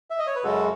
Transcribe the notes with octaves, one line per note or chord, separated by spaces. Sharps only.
E5
D#5
C#5
B4
F#2 C#3 G#3 F#4 A4